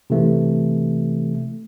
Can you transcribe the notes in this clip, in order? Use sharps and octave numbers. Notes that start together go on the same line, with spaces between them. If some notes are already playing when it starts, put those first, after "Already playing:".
C3 E3 A3